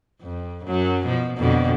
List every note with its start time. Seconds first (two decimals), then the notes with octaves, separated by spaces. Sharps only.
0.21 F2
0.65 F#2 F#3
1.05 B2 F3
1.37 F2 B2 D3